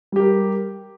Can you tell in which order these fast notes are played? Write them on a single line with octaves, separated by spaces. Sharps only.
G3 G4 A#4